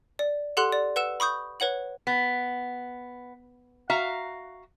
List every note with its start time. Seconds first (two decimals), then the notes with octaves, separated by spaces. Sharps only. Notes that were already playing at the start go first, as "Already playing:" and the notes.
0.19 D5
0.57 G4 A4 F#5 C6 F#6 F#7
0.72 D5
0.96 B4 F#5 E6 E7
1.20 B5 C#6 D#6 G6
1.60 B4 C#5 F#5 F#7
2.07 B3
3.90 F#4 E5 F5 A#5